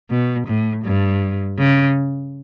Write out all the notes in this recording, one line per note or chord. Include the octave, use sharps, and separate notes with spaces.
B2
A2
G2
C#3